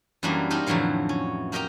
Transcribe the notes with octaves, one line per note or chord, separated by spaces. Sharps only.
F#2 E3 F#3 G3 A#3 D4
C4 D4 D#4 G4 A#4
F2 A2 D3 E3 F#3 F5
C#4
A#3 G4 A#4 D#5 G5 A#5